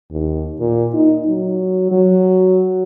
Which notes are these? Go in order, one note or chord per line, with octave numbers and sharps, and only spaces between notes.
D#2
A#2
D#4
F#3
F#3